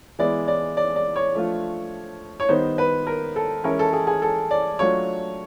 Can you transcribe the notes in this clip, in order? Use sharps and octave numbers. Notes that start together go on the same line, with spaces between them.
E3 G#3 B3 E4 D5
D5
D5
D5
C#5
F3 A3 D4 F4
C#5
D#3 G3 B3 D#4 C5
B4
A#4
A4
E3 G#3 C#4 E4 A#4
A4
G#4
G#4
A4
D5
F#3 A3 D4 F4 C#5